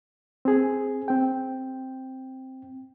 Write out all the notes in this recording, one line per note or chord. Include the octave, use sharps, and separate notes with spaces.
C4 G#4
C4 G5